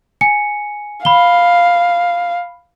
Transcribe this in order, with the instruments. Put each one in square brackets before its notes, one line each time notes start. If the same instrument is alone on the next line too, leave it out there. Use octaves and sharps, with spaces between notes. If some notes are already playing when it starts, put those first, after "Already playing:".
[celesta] G#5 C#7
[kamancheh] F5 [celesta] B5 G7